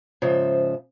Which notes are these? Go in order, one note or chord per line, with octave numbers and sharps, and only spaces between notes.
G#2 C#3 F3 C5 E5